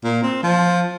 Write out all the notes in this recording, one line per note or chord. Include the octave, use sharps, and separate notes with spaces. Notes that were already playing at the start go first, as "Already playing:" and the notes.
A#2
C4
F3